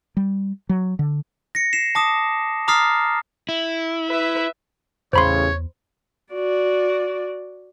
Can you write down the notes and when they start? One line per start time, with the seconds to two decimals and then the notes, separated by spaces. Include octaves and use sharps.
0.17 G3
0.69 F#3
0.99 D3
1.55 A#6 C#7
1.73 C7 E7
1.95 A5 D6 D#6
2.68 A#5 D6 D#6 F6 A6 C7
3.49 E4
4.09 B4 E5
5.13 A1 E2 C#3 C5 C#5 B5 C6
6.34 F#4 D5